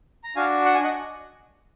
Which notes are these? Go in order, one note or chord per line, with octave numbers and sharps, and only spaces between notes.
A#5
D4 F#4 F5 G#5
F#5
G#5
D#5 F#5